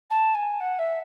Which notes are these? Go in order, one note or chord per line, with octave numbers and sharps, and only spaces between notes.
A5
G#5
F#5
E5